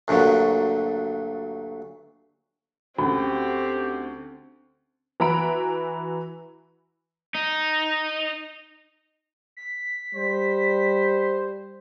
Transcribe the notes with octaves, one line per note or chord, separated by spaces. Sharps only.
D2 G2 A#2 F#3
D2 C4 C#4 F#4 G4
E3 F#4 E5 A#5 B5 D7
D#4
B6
G3 C5